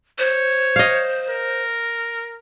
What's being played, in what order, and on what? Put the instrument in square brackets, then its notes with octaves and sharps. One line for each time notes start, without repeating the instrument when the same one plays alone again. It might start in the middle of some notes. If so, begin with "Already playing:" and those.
[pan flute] C5 [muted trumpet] C#5
[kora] D#5 F5
[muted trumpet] A#4